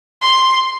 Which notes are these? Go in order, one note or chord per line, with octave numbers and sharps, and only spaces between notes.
C6